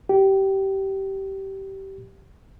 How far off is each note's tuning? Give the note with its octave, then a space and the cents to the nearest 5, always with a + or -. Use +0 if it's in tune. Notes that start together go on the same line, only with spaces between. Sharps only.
G4 -20